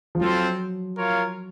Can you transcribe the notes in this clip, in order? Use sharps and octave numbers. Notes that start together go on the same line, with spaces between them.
F3
F#3 C4 F4 A4 C5
F4 A#4 C#5 F5